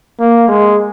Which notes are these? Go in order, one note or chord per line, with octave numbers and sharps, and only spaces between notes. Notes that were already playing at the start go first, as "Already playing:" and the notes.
A#3
G#3